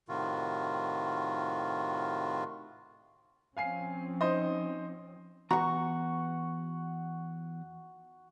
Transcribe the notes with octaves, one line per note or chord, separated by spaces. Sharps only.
A2 C3 D#3 F4 F#4
F3 C4 C#4 F5 G#5 C7
D#4 C5 D#5
E2 F#4 A#5 C#6